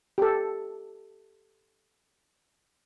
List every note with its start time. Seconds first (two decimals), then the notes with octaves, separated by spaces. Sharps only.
0.18 G4 A4